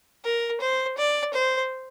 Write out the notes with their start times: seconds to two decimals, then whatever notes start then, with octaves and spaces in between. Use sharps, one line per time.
0.25 A#4
0.61 C5
0.98 D5
1.34 C5